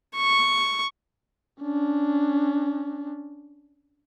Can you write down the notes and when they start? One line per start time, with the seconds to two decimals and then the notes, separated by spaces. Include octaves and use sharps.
0.16 C#6
1.62 C#4 D4